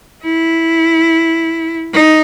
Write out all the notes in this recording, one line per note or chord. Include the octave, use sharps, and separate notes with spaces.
E4
D#4